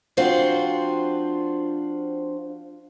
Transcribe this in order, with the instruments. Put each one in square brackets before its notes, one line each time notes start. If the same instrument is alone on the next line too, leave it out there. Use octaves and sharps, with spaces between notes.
[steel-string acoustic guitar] F3 C4 D4 F4 F#4